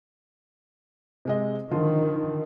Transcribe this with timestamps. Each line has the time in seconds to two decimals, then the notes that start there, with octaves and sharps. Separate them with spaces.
1.25 C3 G#3 D#5
1.71 D3 D#3 F3 F4